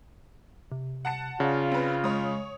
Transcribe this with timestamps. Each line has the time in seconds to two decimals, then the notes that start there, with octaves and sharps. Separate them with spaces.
0.72 C3
1.05 F#5 A5 C#7
1.40 C#3 F4 D5
1.71 C4 B4
2.04 G#3 C#5 D#6